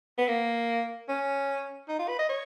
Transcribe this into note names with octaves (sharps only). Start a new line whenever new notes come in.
B3
A#3
C#4
D#4
F4
B4
D#5
C#5